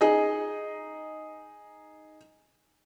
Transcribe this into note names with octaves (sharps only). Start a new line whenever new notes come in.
D#4 G#4 D#5